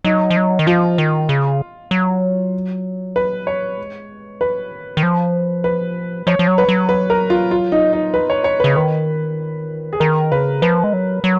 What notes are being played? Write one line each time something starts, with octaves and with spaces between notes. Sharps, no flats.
F#3 D#4
F3
F#3
D#3
F3 F4
D#3
C#3
F#3
B4
C#5
G#3
F#3 B4
D#3
D#3
F3
B4
F3 C#5
F3
F#3
B4
F#3
B4
A#4
F4
F4
D#4
D#4
B4
C#5
C#5
C#3 B4
D#3 B4
G#4
D#3 A#4
C#3 B4
F3 B4
G#3
F#3
F#3